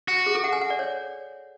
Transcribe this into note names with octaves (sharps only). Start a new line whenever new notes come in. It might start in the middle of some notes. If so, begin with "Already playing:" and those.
F#4
G#4
A4
F#5
G#5
F#5
D5
C#5